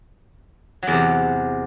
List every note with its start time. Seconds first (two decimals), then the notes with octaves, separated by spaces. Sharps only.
0.83 F#3
0.87 E2
0.92 C3